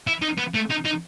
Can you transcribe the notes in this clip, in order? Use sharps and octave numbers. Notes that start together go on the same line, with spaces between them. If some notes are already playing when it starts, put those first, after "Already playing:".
E4
D#4
B3
A3
D#4
D#4